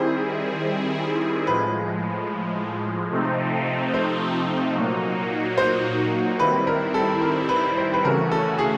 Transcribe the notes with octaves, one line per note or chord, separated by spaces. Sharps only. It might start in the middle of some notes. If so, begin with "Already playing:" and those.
Already playing: D#3 G3 C4 E4 G#4 C5
A2 F3 G#3 B4
C3 F3 A3 C4 D#4
C5
A#2 F#3 A#3 D#4 F#4
C5
D#3 G3 C4 E4 B4
A#4
A4
A#4
B4
C5
B4
C#3 E3 A3 C#4 F#4 A#4
A4
G#4